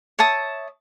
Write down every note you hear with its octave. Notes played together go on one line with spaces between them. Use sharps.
C#5 E5 A5 D#6